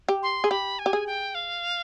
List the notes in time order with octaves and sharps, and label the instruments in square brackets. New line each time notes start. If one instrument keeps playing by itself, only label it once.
[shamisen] G4
[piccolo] C6
[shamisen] G#4
[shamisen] G4 [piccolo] B5
[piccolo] G#5
[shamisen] G4
G#4
[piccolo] G5
F5